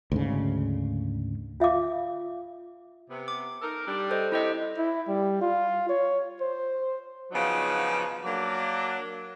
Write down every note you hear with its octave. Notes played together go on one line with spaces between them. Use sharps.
D2 G#2 C#3
F4 E5 F5 D6
C3 B3
D6
D#4 A4 A#4
G3 D4
A4 C5 D#5
C3 E4 G4 C5 D#5
E4
G3
F4
C#5
C5
C#3 F3 F#3 B3 D4 D#4
F#3 A#3 D4